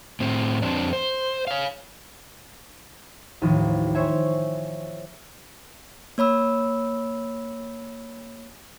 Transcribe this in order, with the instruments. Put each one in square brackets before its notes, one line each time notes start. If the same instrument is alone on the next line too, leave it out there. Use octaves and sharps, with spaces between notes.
[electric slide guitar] A2 C4
F2 C4 D4
C5
C#5 F5
[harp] A1 D#2 F3
C5 C#5 E5 G#5
[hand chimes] A#3 C#5 B5 E6